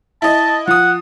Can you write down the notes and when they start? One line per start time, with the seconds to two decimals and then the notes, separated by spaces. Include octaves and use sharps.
0.22 E4 D#5 A5
0.67 F3 F#5 D#6